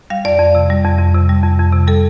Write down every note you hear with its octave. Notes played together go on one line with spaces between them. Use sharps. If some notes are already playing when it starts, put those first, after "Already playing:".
G3 F5
F2 D5
F2
C3
G3
F2
F2
C3
G3
F2
F2
C3
G3 A4